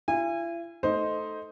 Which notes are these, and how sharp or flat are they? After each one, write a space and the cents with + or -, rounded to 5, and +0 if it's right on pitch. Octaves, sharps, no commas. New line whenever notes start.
E4 +45 G#5 -25
A3 +0 D#4 +10 C5 +0